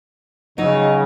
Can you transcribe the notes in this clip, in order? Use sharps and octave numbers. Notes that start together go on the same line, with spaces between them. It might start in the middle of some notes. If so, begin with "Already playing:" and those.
C#3 F#3 D#4 D#5